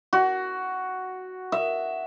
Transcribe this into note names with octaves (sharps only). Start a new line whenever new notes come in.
F#4
E5